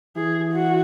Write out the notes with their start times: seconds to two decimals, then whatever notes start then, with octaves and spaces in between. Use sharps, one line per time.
0.16 E3 G#4
0.53 F#4